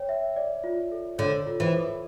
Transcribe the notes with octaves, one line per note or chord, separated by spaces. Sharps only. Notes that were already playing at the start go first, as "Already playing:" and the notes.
Already playing: C#5 G5
E5
D5
F4
A4
D3 C#5
F4
E3
A4